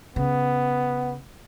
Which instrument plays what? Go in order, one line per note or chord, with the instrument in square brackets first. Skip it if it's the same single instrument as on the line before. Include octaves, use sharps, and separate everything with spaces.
[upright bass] C#3 [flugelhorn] B3